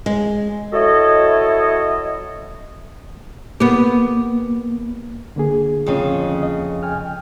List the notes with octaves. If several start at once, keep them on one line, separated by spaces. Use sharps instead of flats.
G#3
E4 F#4 A4 C#5 D#5
A#3 B3 G4
D3 A#3 G#4
F2 C#3
D#5
G5 G#5 F6